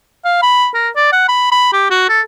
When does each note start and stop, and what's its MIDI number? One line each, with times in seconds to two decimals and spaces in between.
0.24 0.41 77
0.42 0.69 83
0.74 0.89 70
0.96 1.12 74
1.12 1.27 78
1.28 1.50 83
1.51 1.68 83
1.73 1.86 67
1.90 2.04 66
2.09 2.21 69